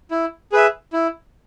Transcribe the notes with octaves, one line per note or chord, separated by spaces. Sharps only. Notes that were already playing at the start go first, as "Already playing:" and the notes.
E4
G#4 B4 E5
E4